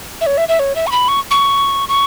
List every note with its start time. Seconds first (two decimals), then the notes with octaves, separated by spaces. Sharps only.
0.21 E5
0.26 C#5
0.38 E5
0.49 E5
0.59 C#5
0.76 E5
0.87 C#6
0.92 B5
1.08 C#6
1.31 C#6
1.89 C#6